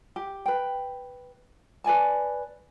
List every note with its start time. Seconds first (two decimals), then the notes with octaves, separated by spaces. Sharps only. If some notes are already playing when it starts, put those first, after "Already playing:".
0.16 G4
0.46 B4 G5
1.84 B4 D5 G#5 A5